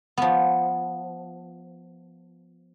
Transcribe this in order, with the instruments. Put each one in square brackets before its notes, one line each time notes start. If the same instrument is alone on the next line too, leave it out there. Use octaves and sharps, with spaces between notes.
[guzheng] F3 B3